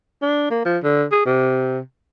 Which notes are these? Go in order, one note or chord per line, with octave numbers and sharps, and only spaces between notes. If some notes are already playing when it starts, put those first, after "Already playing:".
D4
A#3
F3
D3
G#4
C3